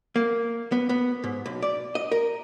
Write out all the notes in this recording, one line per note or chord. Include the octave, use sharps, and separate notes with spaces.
A#3
B3
B3
G#2
B1
D5
D#5
A#4